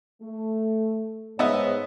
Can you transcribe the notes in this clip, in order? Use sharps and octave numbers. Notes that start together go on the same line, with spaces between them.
A3
G#2 B3 C#5 D#5 E5